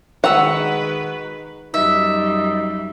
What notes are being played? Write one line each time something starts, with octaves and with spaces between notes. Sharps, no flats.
D#3 G#3 F#4 B4 F#5 A#5 E6
F#2 G3 D#4 E5